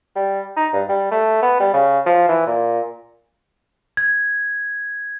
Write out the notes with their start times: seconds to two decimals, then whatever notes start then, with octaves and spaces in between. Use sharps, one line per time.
0.16 G3
0.57 D#4
0.74 G2
0.89 G3
1.11 A3
1.43 B3
1.60 G3
1.73 C#3
2.06 F3
2.29 E3
2.47 A#2
3.97 G#6